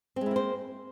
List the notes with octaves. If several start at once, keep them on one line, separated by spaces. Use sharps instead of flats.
G#3 A#3 C4 E4 C5